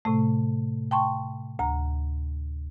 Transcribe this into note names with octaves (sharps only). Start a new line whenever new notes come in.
A2 C3 A3
G5 A5 C6 C#6
D2 A#5